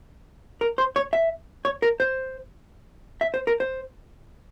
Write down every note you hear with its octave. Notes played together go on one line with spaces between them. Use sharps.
A#4
C5
C#5
E5
C#5
A#4
C5
E5
C5
A#4
C5